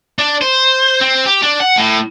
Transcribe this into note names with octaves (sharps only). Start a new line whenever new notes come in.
D4
C5
C4
G4
D4
F#5
A2